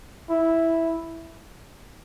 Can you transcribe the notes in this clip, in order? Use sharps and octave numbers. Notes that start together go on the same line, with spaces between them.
E4